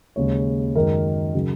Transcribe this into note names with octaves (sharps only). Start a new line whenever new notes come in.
D#2 C#3 G#3 C#5
F#2 D#3 G#3 A#4
C#3 F#3